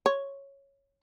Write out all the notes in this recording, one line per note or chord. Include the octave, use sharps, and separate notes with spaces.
C#5